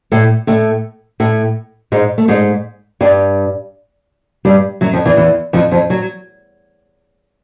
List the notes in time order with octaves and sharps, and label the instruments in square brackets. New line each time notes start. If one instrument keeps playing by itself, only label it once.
[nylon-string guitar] A2 A3
A2 A3
A2 A3
G#2 G#3
A3
G#2 G#3
G2 G3
G2 G3
F#2 F#3
F2 F3
E2 E3
E2 E3
F2 F3
F2 F3
F#3